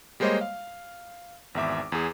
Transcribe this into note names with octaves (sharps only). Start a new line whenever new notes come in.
G3 G#3 A#3 C5 C#5 D#5
F5
G#1 E2 E5 D6
E2 G#4